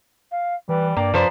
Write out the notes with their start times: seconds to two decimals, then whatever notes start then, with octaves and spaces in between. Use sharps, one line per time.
0.31 F5
0.69 E3 G3 B4
0.97 G2 A#3 D5 G5
1.14 F#2 F3 B4 C5 A#5